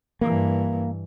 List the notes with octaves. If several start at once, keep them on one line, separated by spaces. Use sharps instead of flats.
G2 E3 A#3